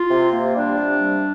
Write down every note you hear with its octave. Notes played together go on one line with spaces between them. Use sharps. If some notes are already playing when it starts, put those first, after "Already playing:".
Already playing: F4
C3
A#3
G3 D4
C3
G3